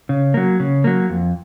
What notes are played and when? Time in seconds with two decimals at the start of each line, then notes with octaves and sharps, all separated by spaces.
0.09 C#3
0.34 F#3 A#3
0.60 C#3
0.84 F#3 A#3
1.10 F2